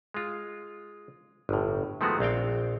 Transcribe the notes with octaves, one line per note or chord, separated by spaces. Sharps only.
G#3 F4
G1 A2
D#3 F3 G#3 A3 B3 F#4
A#1 C4 F5 G5